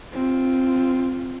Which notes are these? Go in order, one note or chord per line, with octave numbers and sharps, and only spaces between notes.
C4 F4